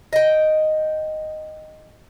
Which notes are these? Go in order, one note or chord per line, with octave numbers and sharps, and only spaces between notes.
D#5 G5